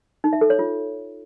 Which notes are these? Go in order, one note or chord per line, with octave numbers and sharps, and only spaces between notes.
D#4
E5
A4
C#5
F4